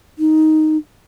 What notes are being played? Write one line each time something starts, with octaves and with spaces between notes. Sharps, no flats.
D#4